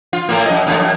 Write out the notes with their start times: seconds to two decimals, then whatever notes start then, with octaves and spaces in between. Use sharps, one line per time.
0.13 F4
0.29 A2 A#3
0.46 F#2 D#5
0.67 D#2 A2
0.80 F#2